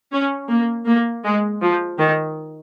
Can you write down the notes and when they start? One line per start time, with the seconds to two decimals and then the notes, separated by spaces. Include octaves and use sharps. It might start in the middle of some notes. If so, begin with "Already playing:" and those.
0.12 C#4
0.49 A#3
0.86 A#3
1.24 G#3
1.61 F3
1.98 D#3